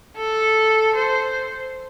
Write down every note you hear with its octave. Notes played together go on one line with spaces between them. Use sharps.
A4
C5